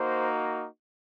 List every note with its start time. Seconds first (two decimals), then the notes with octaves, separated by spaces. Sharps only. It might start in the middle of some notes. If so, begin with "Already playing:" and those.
Already playing: A#3 D#4 F#4 C5